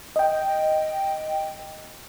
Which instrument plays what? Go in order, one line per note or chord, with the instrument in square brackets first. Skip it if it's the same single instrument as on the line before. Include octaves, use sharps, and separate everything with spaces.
[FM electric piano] D#5 G5